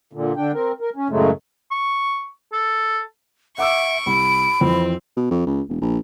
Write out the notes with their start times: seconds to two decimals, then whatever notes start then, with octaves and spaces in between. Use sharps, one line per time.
0.13 A#2 D3
0.36 D3 D4 G5
0.54 C4 A#4
0.80 A#4
0.96 C#4
1.10 F#2 A2 C#3 F#3 G#3 A3
1.71 C#6
2.53 A4
3.58 E5 F#5 C#6 D6 E6 D7
4.06 C2 B5 D7
4.61 F2 E3 F3 C4
5.17 B2
5.31 F2
5.47 C#2
5.69 E1
5.81 A#1